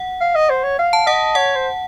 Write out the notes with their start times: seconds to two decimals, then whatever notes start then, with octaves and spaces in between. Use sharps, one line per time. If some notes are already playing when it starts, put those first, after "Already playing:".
Already playing: F#5
0.21 F5
0.35 D#5
0.50 C5
0.64 C#5
0.79 F5
0.93 A5
1.06 D#5 F#5
1.35 C#5 F#5
1.55 C5